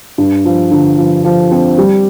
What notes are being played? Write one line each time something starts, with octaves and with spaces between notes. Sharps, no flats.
G2
F3
D3
F3
F3
C4
G3